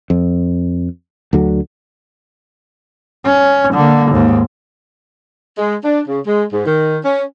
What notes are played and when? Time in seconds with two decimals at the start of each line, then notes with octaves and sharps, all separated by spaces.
0.10 F2
1.33 D2 D3 F#3
3.25 C#4
3.74 D3 A#3
4.12 D#2 G#2
5.58 G#3
5.84 D4
6.08 C#3
6.26 G#3
6.52 G#2
6.66 D#3
7.04 C#4